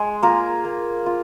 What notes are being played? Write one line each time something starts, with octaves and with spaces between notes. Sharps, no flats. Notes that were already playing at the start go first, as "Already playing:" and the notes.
Already playing: G#3 G#4
A#3 F4 A#4
A#3
F4